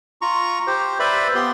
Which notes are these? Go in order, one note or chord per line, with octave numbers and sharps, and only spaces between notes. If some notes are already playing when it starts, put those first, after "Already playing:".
F4 A#5 C#6
G4 C5
B4 C5 D5 E5 B5
B3 F4 G4 C6